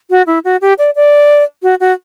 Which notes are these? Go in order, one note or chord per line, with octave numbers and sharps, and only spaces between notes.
F#4
E4
F#4
G4
D5
D5
F#4
F#4